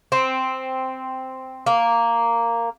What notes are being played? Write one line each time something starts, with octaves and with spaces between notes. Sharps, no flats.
C4
A#3